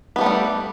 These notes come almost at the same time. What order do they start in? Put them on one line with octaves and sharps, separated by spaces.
B3 G4 A3 C4 G3